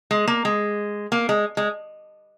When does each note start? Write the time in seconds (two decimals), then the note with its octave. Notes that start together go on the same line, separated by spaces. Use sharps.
0.11 G#3
0.27 A#3
0.45 G#3
1.12 A#3
1.29 G#3
1.57 G#3